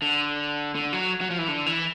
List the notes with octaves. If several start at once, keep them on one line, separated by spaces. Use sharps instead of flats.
D3
D3
F#3
F#3
F3
E3
D3
E3